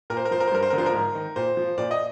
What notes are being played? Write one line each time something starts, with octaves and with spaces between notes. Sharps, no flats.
A#2 A#4
C5
A#4
F3 C5
A#4
C5
G2 A#4
C5
D3 A#4
F3 C5
A#4
G#2
D#3
A#2 C5
F3
A#2 D5
D#5